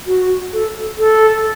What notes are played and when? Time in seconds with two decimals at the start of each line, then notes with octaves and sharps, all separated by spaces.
0.07 F#4
0.53 A4
0.99 A4